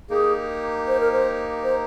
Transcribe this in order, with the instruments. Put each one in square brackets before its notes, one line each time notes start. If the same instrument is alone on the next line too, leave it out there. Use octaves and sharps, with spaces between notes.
[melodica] A#3 D#4 G4 [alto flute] G#4
[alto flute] C5
A#4
C5
C5